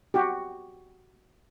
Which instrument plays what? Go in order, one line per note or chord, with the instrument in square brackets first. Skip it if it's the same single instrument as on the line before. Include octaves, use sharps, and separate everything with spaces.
[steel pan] F#4 G4